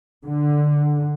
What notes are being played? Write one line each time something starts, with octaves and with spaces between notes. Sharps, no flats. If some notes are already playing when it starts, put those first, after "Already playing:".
D3